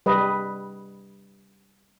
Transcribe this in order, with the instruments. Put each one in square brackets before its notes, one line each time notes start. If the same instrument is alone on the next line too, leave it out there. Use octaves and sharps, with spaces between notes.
[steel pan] G3 B4 D#5